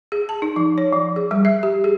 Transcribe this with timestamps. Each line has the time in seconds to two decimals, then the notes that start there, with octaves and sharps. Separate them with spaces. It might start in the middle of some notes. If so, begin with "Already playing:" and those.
0.12 G#4
0.29 A5
0.42 D#4
0.56 F3
0.78 C#5
0.93 F3
1.16 G#4
1.31 G3
1.45 E5
1.63 G4
1.84 G#4